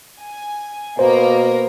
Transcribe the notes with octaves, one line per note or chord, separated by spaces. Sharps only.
G#5
B2 A#3 A#4 C5